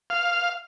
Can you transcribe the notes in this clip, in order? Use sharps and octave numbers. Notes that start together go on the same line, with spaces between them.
F5